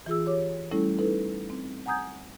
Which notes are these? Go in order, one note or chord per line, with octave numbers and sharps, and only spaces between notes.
E3 F4 G#4 E6
G4 C#5 D6
G3 A3 C#4 E4 A4
D#4 E4 A4 B4
C4
F#5 G#5 A#5 D#6 G6 G#6